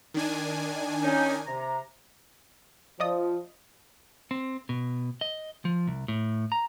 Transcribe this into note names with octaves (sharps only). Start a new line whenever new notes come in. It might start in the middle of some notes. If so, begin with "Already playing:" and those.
D#3 D4 G#5
C#4 D#4
C3 A#5
F3 D5 D#5 D#6
C4
B2
D#5
F3
C2
A2
A#5